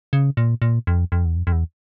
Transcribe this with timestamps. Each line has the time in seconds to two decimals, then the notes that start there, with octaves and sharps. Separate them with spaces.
0.13 C#3
0.37 A#2
0.62 A#2
0.87 F2
1.12 F2
1.25 E2
1.36 F2
1.47 F2
1.52 E2